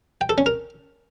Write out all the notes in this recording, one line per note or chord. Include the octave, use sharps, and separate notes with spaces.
G5
A4
C#4
A#4